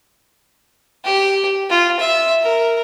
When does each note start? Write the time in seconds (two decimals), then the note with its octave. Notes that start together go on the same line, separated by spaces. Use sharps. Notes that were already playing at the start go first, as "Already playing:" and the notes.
1.05 G4
1.70 F4
2.00 E5
2.43 A#4